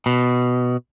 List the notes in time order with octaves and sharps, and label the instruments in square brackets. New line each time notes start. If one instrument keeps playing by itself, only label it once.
[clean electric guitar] B2